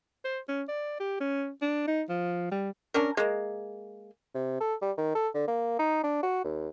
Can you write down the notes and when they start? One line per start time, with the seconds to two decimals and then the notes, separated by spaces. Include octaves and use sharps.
0.25 C5
0.49 C#4
0.69 D5
1.00 G4
1.20 C#4
1.62 D4
1.87 D#4
2.09 F3
2.51 G3
2.94 C#4 D4 A#4
3.17 G#3 A#3
4.35 C3
4.61 A4
4.82 G3
4.98 D#3
5.15 A4
5.35 D3
5.48 A#3
5.79 D#4
6.04 D4
6.23 F#4
6.45 D#2